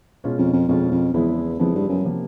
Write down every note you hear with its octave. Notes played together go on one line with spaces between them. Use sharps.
B2 G#3 C#4 F4
F2
F2
F2 B2 G#3 C#4 F4
F2
E2 C#3 F3 G#3 B3 E4
F2 C#3 F3 G#3 B3 E4
G2
F#2
C3 F3 A#3